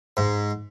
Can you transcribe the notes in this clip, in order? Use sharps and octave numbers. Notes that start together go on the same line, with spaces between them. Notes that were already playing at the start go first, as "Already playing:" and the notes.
G#2